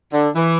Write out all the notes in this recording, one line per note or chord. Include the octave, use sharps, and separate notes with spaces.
D3
E3